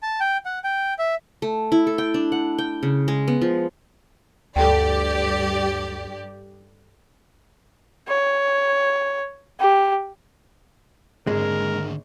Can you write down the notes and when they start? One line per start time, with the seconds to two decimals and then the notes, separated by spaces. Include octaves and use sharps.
0.03 A5
0.20 G5
0.45 F#5
0.64 G5
0.99 E5
1.42 A3
1.72 E4
1.87 A4
1.98 G5
2.14 D4
2.32 F#5
2.58 G5
2.83 C#3
3.08 G#3
3.28 B3
3.42 F3
4.56 D2 G2 G4 A4 D5 G5
8.08 C#5
9.60 G4
11.27 G#1 D#2 D3 G#3 G#4 A#4